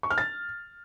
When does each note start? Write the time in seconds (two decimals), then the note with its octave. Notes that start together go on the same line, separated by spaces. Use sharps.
0.03 C#6
0.10 F6
0.18 A6